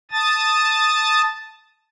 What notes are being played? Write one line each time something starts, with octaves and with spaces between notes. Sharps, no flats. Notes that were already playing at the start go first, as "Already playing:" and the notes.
A5 D#6 A6